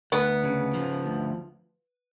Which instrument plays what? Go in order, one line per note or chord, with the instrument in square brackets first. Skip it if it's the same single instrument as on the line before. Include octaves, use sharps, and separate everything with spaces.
[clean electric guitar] D2 [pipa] B3
[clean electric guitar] C#3
F3
D2